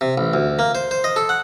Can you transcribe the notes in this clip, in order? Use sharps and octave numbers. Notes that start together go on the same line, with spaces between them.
C3
A1
D2
A#3
C5
C5
D#5
A4
F#5